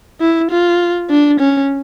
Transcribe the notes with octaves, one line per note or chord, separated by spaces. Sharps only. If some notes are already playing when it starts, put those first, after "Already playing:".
E4
F4
D4
C#4